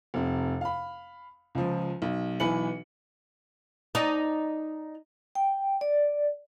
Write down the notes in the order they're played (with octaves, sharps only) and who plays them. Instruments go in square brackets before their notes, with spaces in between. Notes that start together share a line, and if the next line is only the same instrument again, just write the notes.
[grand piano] F1 C3
F5 B5
C#2 F3
B1
B1 E3 B4 G#5 C#7 F#7
[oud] D#4 D5
[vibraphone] G5
D5